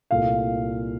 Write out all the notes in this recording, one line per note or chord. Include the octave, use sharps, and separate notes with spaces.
C2 A#2 A3 F5